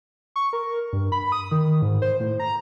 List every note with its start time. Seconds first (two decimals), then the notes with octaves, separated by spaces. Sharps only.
0.36 C#6
0.53 A#4
0.93 G2
1.12 B5
1.32 D#6
1.51 D#3
1.82 G#2
2.02 C5
2.20 A2
2.40 A#5